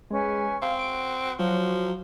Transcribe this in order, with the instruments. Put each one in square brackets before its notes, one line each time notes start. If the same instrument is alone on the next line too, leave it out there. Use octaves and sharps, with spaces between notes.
[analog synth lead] G#3 [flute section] C#4 B4 G#5
[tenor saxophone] C4 [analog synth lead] F5
[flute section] F#4 [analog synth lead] D7
[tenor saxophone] F3 [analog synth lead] F#3